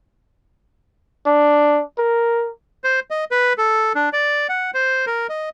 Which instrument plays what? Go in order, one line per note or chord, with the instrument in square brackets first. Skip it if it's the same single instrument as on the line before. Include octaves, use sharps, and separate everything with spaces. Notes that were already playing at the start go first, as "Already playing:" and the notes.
[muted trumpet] D4
A#4
[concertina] C5
D#5
B4
A4
D4
D5
F#5
C5
A#4
D#5